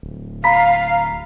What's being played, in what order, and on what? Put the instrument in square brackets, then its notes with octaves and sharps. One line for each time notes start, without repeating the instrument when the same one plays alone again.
[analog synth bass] D1
[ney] F5 [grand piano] A#5 B5 B6